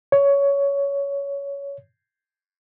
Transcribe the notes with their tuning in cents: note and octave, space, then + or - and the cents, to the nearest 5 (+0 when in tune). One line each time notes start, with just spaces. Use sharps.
C#5 +15